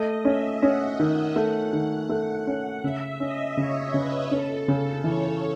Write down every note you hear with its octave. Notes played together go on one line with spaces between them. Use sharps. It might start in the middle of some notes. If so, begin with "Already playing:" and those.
Already playing: A3 D#5
C#4 E5
C#4 F#5
D#3
A3
D#3
A3
C#4
C#3 E5
C#4 D#5
C#3 C#5
C#3 B4
C#4 A4
C#3
E3 C#5